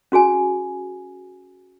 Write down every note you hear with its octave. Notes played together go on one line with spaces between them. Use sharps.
C#4 F#4 G#4 G#5